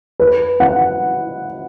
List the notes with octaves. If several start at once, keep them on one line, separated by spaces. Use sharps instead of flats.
B4
F#5